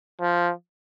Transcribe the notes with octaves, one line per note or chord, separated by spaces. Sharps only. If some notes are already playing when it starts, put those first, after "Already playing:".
F3